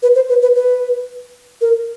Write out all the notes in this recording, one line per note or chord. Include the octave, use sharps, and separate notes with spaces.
B4
C5
B4
B4
B4
A#4